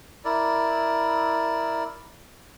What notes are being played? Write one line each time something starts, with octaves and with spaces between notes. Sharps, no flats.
E4 A#4 D5